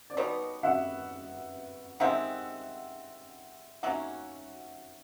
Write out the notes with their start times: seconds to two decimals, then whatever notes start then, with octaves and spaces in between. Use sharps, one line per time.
0.10 D5
0.17 B2 G3 B3 D#4 B4 C#5
0.63 E5 F#5
2.00 C3 D#3 G#3 C4 E5 F#5
3.83 D#3 F#3 A#3 C#4 E5 F#5